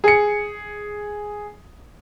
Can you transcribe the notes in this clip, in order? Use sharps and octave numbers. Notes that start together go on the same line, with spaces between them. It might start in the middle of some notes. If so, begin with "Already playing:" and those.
G#4 C#7